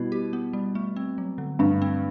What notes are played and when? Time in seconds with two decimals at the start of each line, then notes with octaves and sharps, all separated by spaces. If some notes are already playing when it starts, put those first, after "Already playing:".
Already playing: B2 G3 B3 E4
0.12 G4
0.33 B3
0.53 G3
0.75 A3
0.96 C4
1.18 F#3
1.38 D3
1.59 G2 A3
1.82 C4